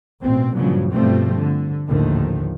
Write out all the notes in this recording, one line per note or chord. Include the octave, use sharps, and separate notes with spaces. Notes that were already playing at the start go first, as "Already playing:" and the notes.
A1 B2 C4
G2 A#2 C#3 F3 F#3
G2 B2 F3 G3 A3 C4
D3
A#1 D#2 A2 D3 D#3 F3